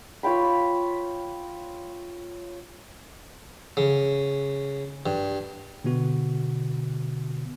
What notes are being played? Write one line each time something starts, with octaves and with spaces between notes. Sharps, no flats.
F4 C#5 G5 B5
C#3
G2
B2 D3 B3 F#4